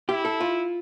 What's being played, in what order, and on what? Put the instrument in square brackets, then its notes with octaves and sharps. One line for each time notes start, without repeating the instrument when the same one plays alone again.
[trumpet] E4 [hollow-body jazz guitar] G4
[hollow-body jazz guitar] A4
F4